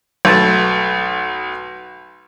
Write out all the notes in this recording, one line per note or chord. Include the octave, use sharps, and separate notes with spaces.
B1 A3 A5